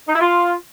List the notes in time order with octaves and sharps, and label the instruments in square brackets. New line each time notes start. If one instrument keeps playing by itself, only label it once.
[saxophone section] D#4
E4
F4